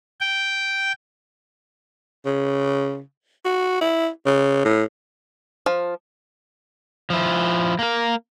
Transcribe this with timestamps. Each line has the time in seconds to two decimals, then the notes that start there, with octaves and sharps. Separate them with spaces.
0.20 G5
2.26 C#3
3.45 F#4
3.81 E4
4.26 C#3
4.65 A2
5.66 F3
7.10 F3 E4
7.79 A#3 A#4